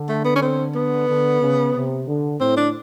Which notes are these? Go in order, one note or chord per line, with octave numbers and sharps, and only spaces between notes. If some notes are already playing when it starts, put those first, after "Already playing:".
Already playing: D3
A3
B3
C#4
C4
B3
D3
C#3
C3
D3
A2 C4
D4